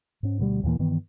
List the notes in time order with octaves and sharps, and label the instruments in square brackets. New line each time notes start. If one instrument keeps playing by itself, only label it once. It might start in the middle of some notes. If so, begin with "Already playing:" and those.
[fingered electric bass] G#2 C#4
D2 B2 F#3 G3
D#2 A#2 E3 A#3
G2 D#3 E3 B3